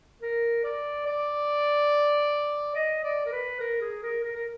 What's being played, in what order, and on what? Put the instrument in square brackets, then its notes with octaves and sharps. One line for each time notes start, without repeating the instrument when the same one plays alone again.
[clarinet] A#4
D5
D5
D#5
D5
A#4
B4
A#4
G#4
A#4
A#4
A#4